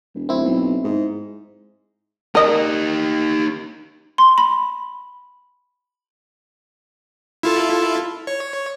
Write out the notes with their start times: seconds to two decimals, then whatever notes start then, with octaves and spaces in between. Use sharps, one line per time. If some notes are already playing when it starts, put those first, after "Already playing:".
0.15 E1
0.29 D1 C4 E4
0.44 B1
0.84 G#2
2.35 D#4 G4 A#4 D#5
4.18 C6
4.38 B5
7.43 E4 F4 A4
8.27 C#5